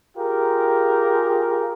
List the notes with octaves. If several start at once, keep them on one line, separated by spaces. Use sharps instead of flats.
F4 G4 G#4 A#4